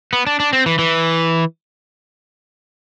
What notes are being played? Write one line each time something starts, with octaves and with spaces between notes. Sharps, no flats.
B3
D4
D4
C4
E3
E3